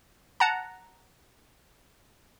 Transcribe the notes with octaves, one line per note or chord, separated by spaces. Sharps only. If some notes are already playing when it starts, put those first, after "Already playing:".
F#5 A5 A#5